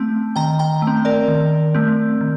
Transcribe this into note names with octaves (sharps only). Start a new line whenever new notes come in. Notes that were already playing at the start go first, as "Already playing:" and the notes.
Already playing: A3 C4 A5
D#3 G5 A#5
G5 A#5
A3
C4
A#4 D5
D#3
A3 C4
D#3